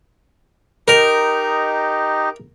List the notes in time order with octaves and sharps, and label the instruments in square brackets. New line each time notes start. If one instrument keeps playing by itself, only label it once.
[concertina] D#4 G4 D#5 [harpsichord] A#4